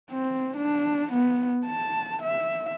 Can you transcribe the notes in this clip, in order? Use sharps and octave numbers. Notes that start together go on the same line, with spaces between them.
C4
D4
B3
A5
E5